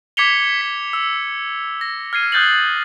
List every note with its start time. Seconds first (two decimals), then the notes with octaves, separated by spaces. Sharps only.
0.17 D6 G#6 B6 C#7 F7 G7
0.61 B6
0.93 E6
1.81 A#6
2.13 F6 G#6 C7 D#7
2.32 D#6 F#6 G6 A6 C7 F#7